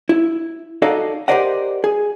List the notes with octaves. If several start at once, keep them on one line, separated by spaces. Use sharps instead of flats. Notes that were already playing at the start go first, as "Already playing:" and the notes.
E4
D#4 F#4 A4 D5 D#5 F5
G4 A#4 C5 D5 D#5 F#5
G#4